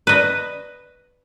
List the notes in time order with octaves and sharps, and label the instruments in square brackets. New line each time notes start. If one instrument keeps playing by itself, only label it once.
[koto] B4 D#5